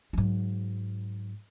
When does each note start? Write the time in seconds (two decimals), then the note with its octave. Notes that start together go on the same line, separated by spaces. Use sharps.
0.13 G#2 F#3